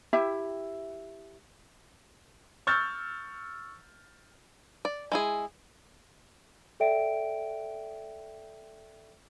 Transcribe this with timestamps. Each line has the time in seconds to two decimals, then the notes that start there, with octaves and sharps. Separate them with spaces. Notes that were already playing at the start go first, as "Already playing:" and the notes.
0.13 E4 G4 E5
2.67 C#6 E6 F6 G6 A6
4.85 D5
5.12 G#3 E4 G#4
6.80 A4 D5 E5 G5 D7